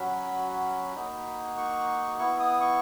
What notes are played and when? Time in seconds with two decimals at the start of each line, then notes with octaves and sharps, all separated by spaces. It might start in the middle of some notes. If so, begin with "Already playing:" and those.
Already playing: F#3 C#4 F#4 B5
0.95 A#3 D#4 F#4
1.57 C#6
2.19 B3 E4 C#6
2.40 D#6
2.60 C#6